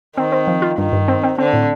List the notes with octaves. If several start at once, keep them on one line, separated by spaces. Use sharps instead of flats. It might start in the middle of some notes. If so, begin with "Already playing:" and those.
D#3 C4
C4
F3
F4
G2 D#3
G2
C4
C4
D3 C4
A2